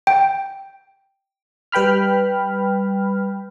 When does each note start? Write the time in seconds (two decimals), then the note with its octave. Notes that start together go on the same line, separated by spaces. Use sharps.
0.07 G5
1.72 G3 B4 G5 B5 F6